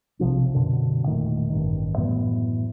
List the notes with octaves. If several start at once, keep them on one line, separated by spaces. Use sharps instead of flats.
B1 C3 F3 D4
F#2 B2 D3
E1 A#2 D#3 A3
A1 G2 D#3
F#2 A2 E3 B3